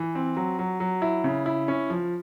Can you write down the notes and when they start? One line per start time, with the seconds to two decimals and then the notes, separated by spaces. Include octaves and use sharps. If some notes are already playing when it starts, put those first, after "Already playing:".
Already playing: E3
0.15 C4
0.37 F#3
0.59 F#3
0.80 F#3
1.02 E4
1.24 C#3
1.46 E4
1.68 C#4
1.90 F3